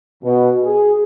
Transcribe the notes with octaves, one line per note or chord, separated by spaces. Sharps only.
B2
G#4